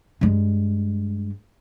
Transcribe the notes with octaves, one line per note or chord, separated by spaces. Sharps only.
G2 G#3